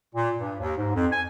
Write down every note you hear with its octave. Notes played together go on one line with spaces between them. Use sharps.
A#2
G2
D#2
G#2
F2
G#5